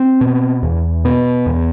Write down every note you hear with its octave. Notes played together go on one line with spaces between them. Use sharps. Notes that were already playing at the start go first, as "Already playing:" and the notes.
Already playing: C4
B2
E2
B2 B3
E2